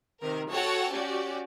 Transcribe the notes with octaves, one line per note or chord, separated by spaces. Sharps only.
C3 D#3 A#4
F#4 A4 C#5 F#5 G5 A5
C#4 F#4 G4 D5